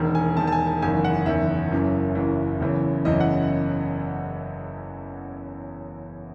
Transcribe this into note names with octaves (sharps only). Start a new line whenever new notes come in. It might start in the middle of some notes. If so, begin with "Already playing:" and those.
Already playing: E1 E2 D#3
G#5
E1 E2 D#3 A5
A5
G#5
A5
F#1 E2 D#3 G#5
F#5
F#1 E2 D#3 E5
F#1 F#2 E3
F#1 F#2 E3
F#1 E2 C#3 E3
F#1 E2 C#3 E3 D#5
F#5